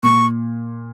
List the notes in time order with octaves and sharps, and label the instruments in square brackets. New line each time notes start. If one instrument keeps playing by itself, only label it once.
[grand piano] A#2 [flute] C#6